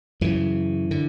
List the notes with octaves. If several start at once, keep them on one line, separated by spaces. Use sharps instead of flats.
F#2 C#3 E3
D3